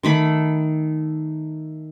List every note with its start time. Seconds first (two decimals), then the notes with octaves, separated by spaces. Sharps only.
0.03 D#3 A3 B5